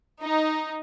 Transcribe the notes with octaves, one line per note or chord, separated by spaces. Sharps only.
D#4